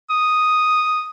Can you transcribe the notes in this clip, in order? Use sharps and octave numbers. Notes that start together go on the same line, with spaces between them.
D#6